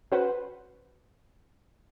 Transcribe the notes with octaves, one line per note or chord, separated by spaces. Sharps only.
C#4 F#4 B4 C5 F#5